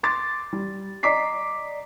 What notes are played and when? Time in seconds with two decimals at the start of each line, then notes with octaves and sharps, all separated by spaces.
0.03 C6 D6 A6
0.53 G3
1.03 D5 D#5 A#5 D6 B6 C7